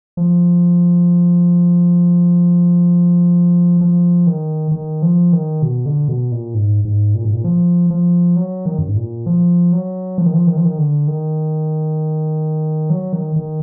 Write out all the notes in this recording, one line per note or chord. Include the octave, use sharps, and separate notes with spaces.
F3
F3
D#3
D#3
F3
D#3
B2
D3
B2
A#2
G#2
G#2
A#2
G#2
A#2
F3
F3
F#3
D#3
F#2
G#2
A#2
F3
F#3
F3
D#3
F3
D#3
F3
D#3
D3
D#3
F#3
D#3
D#3